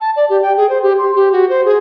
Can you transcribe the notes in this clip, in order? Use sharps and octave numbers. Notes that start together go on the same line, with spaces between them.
A5
D5
G4
G5
G#4
C5
G4
C6
G4
F#4
C5
G#4